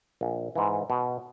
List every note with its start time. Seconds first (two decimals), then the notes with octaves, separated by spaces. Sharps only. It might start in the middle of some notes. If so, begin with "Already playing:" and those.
0.21 A#1
0.55 G#2 E3
0.90 B2